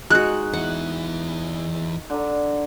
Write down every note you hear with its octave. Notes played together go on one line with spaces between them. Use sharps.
G#3 D#4 F#4 F#6
E2 E4 F#5
D3 A#5